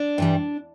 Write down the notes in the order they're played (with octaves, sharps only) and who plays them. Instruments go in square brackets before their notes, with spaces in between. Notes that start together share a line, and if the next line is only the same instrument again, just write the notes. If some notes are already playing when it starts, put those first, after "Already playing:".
Already playing: [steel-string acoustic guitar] D4
G2 E3 G3